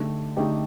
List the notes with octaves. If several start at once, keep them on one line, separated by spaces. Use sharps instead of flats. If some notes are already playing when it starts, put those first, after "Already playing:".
Already playing: D3 A3 D#4 G4
D3 A3 D#4 G4